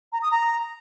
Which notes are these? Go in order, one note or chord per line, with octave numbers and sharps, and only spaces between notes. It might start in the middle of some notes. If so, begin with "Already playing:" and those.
A#5
D#6
A#5